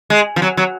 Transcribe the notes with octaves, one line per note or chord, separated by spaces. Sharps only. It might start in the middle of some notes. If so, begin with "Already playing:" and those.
G#3
F3
F#3
F#3